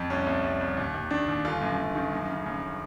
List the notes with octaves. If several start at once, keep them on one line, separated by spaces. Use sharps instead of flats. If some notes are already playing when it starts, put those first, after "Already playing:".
Already playing: F2
C2 C#4
C2
C2
C2
D#2
D#2
D#3 D4
D#2
G1 F4
F#2
F#2
D#3
F#2
C#3
F#2